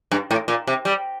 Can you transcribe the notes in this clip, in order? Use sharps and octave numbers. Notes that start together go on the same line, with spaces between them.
G2
A2
A#2
C3
G3